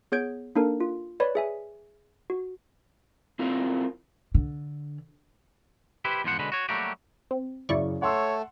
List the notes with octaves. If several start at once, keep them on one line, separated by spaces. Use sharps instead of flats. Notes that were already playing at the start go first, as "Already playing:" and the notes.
B3 G#4 C#5 G6 G#6 D7
A#3 D4 D#4 A4 A#4
F4
B4 C#5 D5 B5
G#4 E5 G#5
F#4
C4 E4 F4 A#4
D3
E4 G4 B4 C5
E2 G#2 F3 C5 F#5
B2 D3 G#3 C#4 B4
F#4 C#5
F#3 G3 A3 A#3 F#4 G4
C4
F#2 C#3 E4 D5 C#6
A3 C#5 F#5 C6 E6